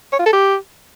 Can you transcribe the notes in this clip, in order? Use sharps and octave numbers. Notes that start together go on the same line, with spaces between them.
C#5
F4
A4
G4